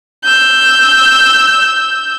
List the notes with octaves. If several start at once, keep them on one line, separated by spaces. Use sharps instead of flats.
E6 G6